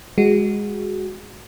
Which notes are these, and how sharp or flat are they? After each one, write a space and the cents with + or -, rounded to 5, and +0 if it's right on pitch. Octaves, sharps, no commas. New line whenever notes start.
G#3 -10 F#4 +0